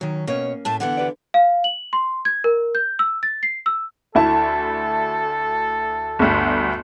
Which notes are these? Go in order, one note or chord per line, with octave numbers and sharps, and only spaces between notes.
D#3 F#3 C#4
B2 A#3 C#4 C#5
A2 A3 A5
D3 E3 B3 F#5
G4 B4 D5
F5
F#7
C6
G#6
A#4
G6
E6
A6
C7
E6
D2 E4 A4 A5
G1 D2